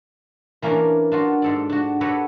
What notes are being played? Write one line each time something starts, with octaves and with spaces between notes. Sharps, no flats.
E3 A#3 C#4 D4 A#4
D4 F4 F#4
G#2 A4 D5
D4 F#4
F#4 G4 A4 B4 C#5 D5